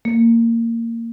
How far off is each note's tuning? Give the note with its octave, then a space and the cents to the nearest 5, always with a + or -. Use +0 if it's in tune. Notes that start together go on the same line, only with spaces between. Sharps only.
A#3 -20